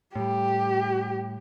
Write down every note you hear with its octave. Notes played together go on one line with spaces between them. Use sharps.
A2 G3 G4